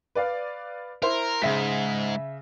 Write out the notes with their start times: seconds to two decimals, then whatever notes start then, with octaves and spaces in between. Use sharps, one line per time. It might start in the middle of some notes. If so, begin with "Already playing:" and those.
0.15 B4 D5 F5
1.02 E4 A#4 C5
1.42 G#2 C#3 E5 B6